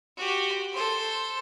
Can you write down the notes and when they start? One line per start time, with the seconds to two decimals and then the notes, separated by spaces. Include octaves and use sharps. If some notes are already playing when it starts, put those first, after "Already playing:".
0.17 F#4 G4
0.72 A4 C5